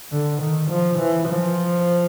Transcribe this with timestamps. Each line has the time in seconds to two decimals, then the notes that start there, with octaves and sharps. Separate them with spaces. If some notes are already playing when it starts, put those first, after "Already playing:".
0.12 D3
0.41 D#3
0.70 F3
0.99 E3
1.28 F3